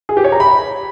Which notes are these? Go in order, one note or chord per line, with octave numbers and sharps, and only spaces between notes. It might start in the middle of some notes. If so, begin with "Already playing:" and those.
G#4
G4
C#5
A#5
B5